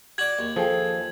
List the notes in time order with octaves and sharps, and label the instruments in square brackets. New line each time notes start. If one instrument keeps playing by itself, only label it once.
[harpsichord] F#4 D5 [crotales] G#6 F#7
[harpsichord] D#2
[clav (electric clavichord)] F3 [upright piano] G#4 A4 G5